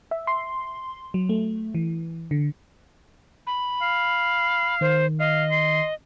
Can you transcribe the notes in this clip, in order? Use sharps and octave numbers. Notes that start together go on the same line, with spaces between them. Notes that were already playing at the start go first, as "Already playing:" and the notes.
E5
C6
F#3
A3
E3
D3
B5
F5
D#3 C5
D#5 F5
C6